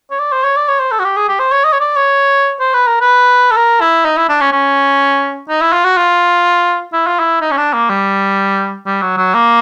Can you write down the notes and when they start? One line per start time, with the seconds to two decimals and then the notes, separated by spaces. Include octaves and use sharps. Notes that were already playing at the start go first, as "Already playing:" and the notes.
0.11 C#5
0.19 D5
0.32 C5
0.44 C#5
0.57 D5
0.68 C#5
0.80 C5
0.92 A4
0.99 F#4
1.04 G4
1.17 G#4
1.29 G4
1.40 C5
1.52 C#5
1.64 D#5
1.73 C#5
1.80 D5
1.96 C#5
2.60 C5
2.74 B4
2.87 A#4
3.01 B4
3.51 A4
3.57 A#4
3.81 E4
4.05 D#4
4.17 E4
4.29 D4
4.41 C#4
4.52 C#4
5.49 D#4
5.62 E4
5.73 F4
5.85 F#4
5.97 F4
6.93 E4
7.07 F4
7.20 E4
7.41 D#4
7.51 C#4
7.57 D4
7.73 A#3
7.90 G3
8.86 G3
9.02 F#3
9.18 F#3
9.34 A#3